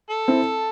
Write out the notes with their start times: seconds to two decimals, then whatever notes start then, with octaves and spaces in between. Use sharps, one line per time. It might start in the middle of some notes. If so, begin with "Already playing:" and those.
0.10 A4
0.28 C4 E4